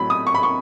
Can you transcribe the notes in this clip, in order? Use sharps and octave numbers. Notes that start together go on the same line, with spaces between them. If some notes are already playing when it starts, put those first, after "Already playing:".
Already playing: A2 F#3 A3 B5
D#6
C#6
B5
C#6